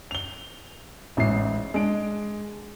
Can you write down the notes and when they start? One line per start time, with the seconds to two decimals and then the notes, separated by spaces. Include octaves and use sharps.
0.11 F7 G7
1.17 A1 G#2 E5 C7
1.74 G#3 D4 D7